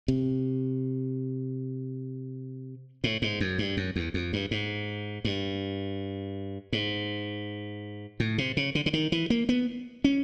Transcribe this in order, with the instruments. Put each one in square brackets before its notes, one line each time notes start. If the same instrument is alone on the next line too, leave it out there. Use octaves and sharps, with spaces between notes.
[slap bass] C3
A2
G#2
F#2
G2
F#2
E2
F2
G2
G#2
G2
G#2
A2
C3
C#3
D3
D3
D#3
E3
A#3
B3
C#4